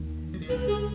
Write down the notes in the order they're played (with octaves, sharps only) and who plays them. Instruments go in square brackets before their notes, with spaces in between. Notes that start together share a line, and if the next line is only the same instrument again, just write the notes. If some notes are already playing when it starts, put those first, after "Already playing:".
Already playing: [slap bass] D#2 D#3
F#3
D#3
[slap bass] C#2 C#3 [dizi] B4
[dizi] G#4